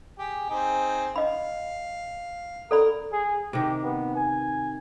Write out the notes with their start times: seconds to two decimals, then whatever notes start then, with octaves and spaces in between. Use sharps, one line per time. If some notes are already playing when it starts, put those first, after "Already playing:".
0.18 G4 G#4
0.49 C4 D#4 G#4
1.16 D#5 F5 B5
2.71 A4 A#4 D5 B5
3.12 G#4
3.53 C3 D#3 G4
3.83 B3
4.15 G#5